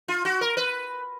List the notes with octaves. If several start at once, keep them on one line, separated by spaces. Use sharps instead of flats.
F4
F#4
A#4
B4